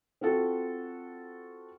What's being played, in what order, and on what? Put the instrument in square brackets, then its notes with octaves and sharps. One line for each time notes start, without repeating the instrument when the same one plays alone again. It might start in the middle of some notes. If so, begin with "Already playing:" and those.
[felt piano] C4 F4 F#4 A4